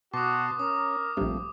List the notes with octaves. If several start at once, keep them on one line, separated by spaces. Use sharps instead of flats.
B2 F#4 A5 C6 D6 D#6
C#4 A#4 D#6
A#1 G2 F3 A3 C4